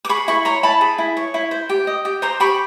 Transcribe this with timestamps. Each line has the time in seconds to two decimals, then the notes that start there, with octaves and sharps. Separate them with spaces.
0.05 D6
0.09 G#4 B5 C#6
0.28 E4 B5 C#6
0.45 C#5 A#5 C6
0.63 E4 A5 B5
0.81 G#4
0.98 E4
1.17 C#5
1.34 E4
1.51 C5
1.69 G4
1.87 D#5
2.05 G4
2.22 C5 A#5 C6
2.40 G4 B5 C#6